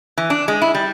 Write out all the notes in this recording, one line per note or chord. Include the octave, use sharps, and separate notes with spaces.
E3
D4
G#3
E4
G3